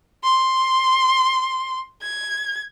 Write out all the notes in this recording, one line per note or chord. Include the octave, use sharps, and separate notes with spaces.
C6
G#6